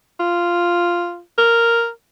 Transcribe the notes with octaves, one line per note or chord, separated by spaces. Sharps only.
F4
A#4